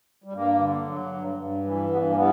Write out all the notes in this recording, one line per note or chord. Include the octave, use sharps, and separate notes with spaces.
G3
G2 A#3
D3
F#3
G2
G2
E3
G2 G3 B3
A#3
E3 G3 B3